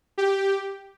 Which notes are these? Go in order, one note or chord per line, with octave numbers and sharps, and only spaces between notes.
G4